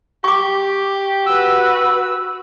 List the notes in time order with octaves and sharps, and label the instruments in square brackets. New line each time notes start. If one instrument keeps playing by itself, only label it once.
[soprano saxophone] G4 [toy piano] C#6 D6
[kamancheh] F#4 B4 [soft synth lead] E6